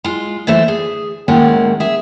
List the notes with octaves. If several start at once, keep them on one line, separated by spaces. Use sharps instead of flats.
G#3 F4
D3 E3 A3 C5 E5
G#4
A2 D#3 G#3 A#3 C#4 F#5
G#4 E5